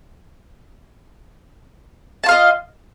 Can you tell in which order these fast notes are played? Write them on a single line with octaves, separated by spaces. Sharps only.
A5 F4 F5 D#5